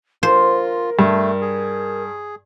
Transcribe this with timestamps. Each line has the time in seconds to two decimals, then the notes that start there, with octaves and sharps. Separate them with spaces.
0.23 F4 A#4 C5
0.99 G2 A3
1.42 G#4